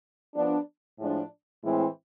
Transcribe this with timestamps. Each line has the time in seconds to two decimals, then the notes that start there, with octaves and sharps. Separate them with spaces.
0.35 F3 B3 D4
0.99 A2 F3 G#3 D4
1.63 A2 E3 G#3 C4 E4